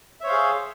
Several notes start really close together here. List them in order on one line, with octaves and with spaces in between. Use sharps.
E5 C#5 C5 F5 G#4